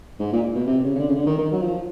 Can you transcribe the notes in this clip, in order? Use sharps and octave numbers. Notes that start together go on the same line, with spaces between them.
G#2
A#2
B2
C3
C#3
C#3
D3
C#3
D3
D#3
D#3
F#3
F3